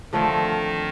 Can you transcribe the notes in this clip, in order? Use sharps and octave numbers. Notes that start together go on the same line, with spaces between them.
D3 D#3 F3 A3 C4